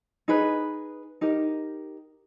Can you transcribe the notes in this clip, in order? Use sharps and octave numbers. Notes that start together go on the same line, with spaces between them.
D#4 G#4 B4
D#4 G4 A#4